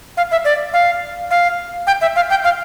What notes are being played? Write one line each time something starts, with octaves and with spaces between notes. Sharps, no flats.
F5
E5
D5
F5
F5
G5
E5
F5
G5
F5